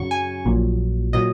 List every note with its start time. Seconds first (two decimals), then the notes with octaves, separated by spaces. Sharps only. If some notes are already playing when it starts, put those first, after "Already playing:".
Already playing: F#2 C#3 F#3 C#6
0.11 G#5
0.45 A#1 A#2 F#3
1.13 A#2 F#3 D#5